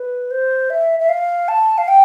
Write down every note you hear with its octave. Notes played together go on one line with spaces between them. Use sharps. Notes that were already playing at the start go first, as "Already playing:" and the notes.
Already playing: B4
C5
E5
E5
F5
A5
F5
G5